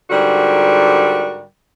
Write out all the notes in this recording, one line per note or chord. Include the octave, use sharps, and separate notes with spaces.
G#2 D3 G3 F#4 A#4